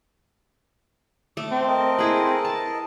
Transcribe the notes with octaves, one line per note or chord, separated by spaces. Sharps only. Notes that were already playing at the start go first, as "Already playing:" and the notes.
A3 D6
C4
A4 A#4 D#5
E4 G#4 B4
A5